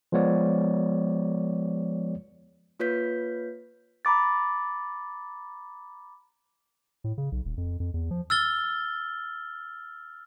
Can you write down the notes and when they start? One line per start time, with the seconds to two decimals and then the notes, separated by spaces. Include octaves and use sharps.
0.12 F3 G#3 B3 C#5 D5
2.80 A#3 F4 B4 C#5 G6 B6
4.05 A#5 B5 D6 A6
7.04 A2
7.18 C#3
7.32 B1
7.45 D#1
7.58 F2
7.80 F2
7.94 E2
8.11 F3
8.30 E6 F6 A6 G7